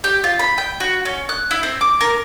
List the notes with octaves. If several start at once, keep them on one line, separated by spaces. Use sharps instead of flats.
G4
F4
B5
G5
F#4
C#4
F#6
E4
C4
D6
A#4